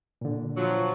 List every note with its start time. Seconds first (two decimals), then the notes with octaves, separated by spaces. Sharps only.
0.21 A#2 D3
0.57 F3 F#3